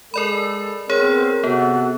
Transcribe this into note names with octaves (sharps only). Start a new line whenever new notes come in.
G#3 A4 A#4 D5 B5
B3 C4 G#4 A#4 C#5
C3 B3 F#4 A4